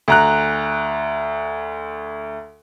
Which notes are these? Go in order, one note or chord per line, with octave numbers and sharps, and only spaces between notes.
D2 A#5 F#6